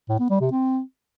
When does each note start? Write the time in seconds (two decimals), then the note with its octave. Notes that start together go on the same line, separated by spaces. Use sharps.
0.09 A2
0.19 B3
0.30 G3
0.41 C3
0.51 C4